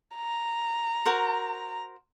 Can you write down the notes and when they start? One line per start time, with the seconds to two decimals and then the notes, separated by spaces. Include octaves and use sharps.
0.16 A#5
1.05 F#4 A#4 C5